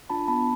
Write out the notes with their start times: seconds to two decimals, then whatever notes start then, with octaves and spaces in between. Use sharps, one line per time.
0.10 D4 F4 A5 B5
0.28 B3 A5 B5